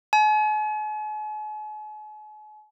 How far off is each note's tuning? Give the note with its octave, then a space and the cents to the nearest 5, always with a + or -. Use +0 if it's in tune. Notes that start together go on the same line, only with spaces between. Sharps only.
G#5 +45